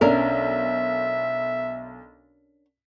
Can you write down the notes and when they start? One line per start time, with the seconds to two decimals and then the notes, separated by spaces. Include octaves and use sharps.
0.01 B1 C#4 D4 A#4 E5